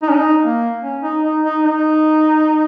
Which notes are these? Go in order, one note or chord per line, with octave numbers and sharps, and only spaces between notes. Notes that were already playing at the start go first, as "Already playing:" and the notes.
D#4
C#4
D#4
A#3
C#4
D#4
D#4
D#4
D#4